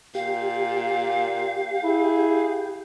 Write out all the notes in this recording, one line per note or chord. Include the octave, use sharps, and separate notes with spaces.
A#2 G4 F5
E4 G#4